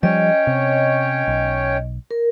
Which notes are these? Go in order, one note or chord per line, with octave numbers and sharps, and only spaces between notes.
F3 G3 C#4 C#5 D#5 G5
C3
B1
A#4